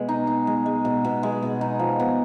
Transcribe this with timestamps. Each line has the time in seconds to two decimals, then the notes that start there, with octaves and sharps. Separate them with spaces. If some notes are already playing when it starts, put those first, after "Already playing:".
Already playing: B2 G#3
0.09 D#4
0.27 D#4
0.47 G#3
0.66 G#3
0.85 B2
1.05 B2
1.23 G#3
1.43 B2
1.61 D#4
1.79 F3
2.00 B3